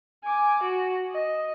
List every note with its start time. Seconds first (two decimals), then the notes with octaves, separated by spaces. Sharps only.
0.24 G#5 D6
0.63 F#4
1.12 D#5